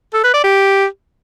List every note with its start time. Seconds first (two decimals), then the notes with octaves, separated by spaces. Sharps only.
0.14 A4
0.24 B4
0.34 D5
0.44 G4